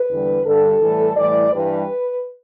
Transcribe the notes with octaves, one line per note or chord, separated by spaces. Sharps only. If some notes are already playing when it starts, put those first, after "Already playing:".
Already playing: B4
E2 D3 G3
G2 D3 G3 A4
A2 E3 G3
A2 E3 G3 D5
G2 E3 G3 B4